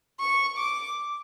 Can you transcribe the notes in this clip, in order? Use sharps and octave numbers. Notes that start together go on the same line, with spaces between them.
C#6
D6